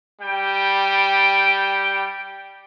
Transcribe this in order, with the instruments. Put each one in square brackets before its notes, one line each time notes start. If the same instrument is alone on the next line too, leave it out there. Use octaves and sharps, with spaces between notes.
[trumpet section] G3 G5